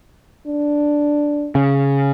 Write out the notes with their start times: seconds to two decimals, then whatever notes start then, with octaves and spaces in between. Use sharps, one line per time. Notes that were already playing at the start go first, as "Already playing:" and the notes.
0.47 D4
1.55 C#3